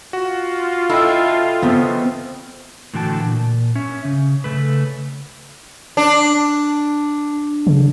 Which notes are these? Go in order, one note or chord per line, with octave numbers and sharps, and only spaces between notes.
F4 F#4
B2 E4 A4 D#5 G5
E2 C#3 B3 C4
A2 D3 E3 F#4 G5 A5
A#2
C#4 E5
C#3
C#3 A3 B4
D4
C#3